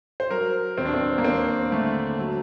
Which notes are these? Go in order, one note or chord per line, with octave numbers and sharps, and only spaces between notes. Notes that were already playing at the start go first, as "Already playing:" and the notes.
C5
F#3 A#4
D#2 C4
D4
C4
A#3
D#2 C4
D3 A3
F#3